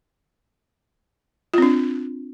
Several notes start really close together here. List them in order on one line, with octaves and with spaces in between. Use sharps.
F4 C4 D4